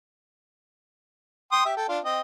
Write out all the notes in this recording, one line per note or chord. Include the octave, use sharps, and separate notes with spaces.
G5 C6 D#6
G4 E5
A4 G5
D4 F4
C4 D#5